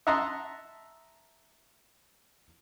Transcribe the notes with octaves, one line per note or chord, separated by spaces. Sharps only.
E5 F#5 A5 A#5 C6 D#6